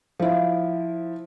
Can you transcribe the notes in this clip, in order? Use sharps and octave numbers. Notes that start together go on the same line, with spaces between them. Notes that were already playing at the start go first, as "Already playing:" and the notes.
F3 E4